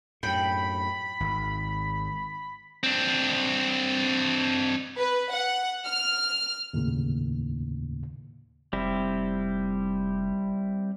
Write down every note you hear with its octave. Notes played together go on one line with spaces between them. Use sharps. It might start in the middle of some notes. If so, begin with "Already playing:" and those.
F#2 A2 G5 B5
G#1
C4 D4
B4
F#5
F6
D#2 A2 C#3
F1 G3 C4 E4